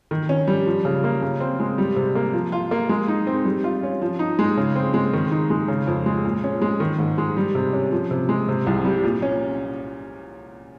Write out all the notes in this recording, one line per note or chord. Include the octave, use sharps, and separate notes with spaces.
D#3
C#4
G3
F3
C#3
A#3
C#3
C4
G#3
G3
C3
A#3
F3
F4
A#3
G#3
D#4
C4
G3
F4
C#4
F3
D#4
G#3
C#3
C4
G#3
D#3
D#4
G#3
C#3
F2
G#3
A#2
C#4
G#3
D#3
G#2
G#3
G3
C3
C#4
F3
C3
G#3
C3
C2
G3
A#2
C#4